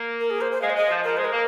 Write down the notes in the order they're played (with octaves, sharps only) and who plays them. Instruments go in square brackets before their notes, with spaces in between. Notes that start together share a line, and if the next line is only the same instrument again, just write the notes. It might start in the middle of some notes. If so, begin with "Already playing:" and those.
Already playing: [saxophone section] A#3
[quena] A#4
G#4
C5
C5
[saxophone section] G#3 [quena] F5
[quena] C5
[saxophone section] G#3 [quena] D#5
[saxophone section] F3
[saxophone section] F3 [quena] A#4
[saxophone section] G#3 [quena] C5
[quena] A#4
[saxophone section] A#3